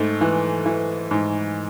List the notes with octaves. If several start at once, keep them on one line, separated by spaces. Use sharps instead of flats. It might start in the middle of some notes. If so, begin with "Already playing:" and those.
Already playing: G#2 A3
E3
E3
G#2